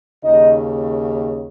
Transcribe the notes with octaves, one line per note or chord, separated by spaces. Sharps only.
D#2 C#3 D#4 D#5